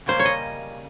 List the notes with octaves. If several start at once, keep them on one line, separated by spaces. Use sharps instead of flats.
C#3 G3 A#3 C#4 C5
C#5
D#5